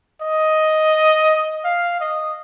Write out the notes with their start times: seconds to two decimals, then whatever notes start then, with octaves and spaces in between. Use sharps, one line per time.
0.22 D#5
1.64 F5
2.00 D#5